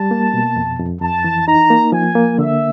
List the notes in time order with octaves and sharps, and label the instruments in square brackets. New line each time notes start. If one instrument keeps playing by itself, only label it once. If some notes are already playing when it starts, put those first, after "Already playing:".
Already playing: [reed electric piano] G3 [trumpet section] A5
[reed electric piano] A#3
B2
F2
F2
[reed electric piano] F2 [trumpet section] A5
[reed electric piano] E3
[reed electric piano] D#4 [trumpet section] A#5
[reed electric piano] A#3
[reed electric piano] F3 [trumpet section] G#5
[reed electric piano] A#3
[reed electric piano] D3 [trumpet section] E5